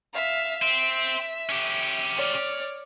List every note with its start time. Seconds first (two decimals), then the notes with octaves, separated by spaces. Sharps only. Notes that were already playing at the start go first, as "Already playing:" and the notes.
0.13 E5 F5
0.62 C4 E5
1.49 C#4 G4
2.17 C#5 D5 F6